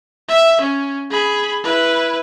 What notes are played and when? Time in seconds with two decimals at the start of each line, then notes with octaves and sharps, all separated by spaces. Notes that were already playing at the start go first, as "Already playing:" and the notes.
0.28 E5
0.61 C#4
1.11 G#4 B5
1.64 E4 B4